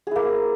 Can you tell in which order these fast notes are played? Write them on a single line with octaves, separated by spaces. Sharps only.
G#4 E4 A#3